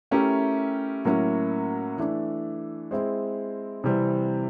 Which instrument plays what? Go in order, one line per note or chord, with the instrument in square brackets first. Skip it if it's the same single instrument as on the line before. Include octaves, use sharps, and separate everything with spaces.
[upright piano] A3 C#4 E4 G4 A#4
A2 F#3 A#3 C#4 E4
E3 A3 D4
G#3 C4 E4
C3 E3 G3 C4